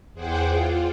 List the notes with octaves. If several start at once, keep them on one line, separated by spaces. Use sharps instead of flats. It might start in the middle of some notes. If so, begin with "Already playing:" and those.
E2 G#4 C5 F#5 G5 D6
F4